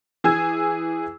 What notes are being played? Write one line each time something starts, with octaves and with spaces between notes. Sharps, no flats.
E3 G#4 G#5 E6 G#6